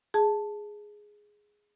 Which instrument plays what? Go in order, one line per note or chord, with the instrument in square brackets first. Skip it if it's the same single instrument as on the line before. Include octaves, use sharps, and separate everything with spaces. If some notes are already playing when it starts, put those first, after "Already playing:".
[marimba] G#4 A5